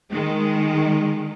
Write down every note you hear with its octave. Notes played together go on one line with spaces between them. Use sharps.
D#3 G#3